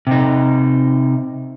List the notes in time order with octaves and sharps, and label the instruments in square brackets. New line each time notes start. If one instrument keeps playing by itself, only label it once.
[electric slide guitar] C3 D#4